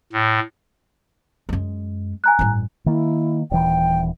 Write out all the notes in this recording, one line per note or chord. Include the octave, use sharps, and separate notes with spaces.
A2
F#2 G#3
G#5 A#5 F#6
A1 G2
D#3 A#3 E4
D#1 E3 G5